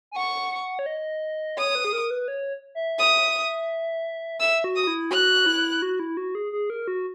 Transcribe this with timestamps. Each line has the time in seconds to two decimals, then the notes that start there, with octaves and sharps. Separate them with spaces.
0.11 G#5
0.16 F#5 C#6
0.79 C#5
0.86 D#5
1.58 C#5 D#6
1.75 B4
1.85 G#4
1.93 A#4
2.11 B4
2.28 C#5
2.75 E5
2.99 D#6
4.40 E5 E6
4.64 F#4
4.76 D#6
4.87 E4
5.11 F#4 F#6
5.46 E4
5.82 F#4
5.99 E4
6.17 F#4
6.35 G#4
6.52 G#4
6.70 A#4
6.88 F#4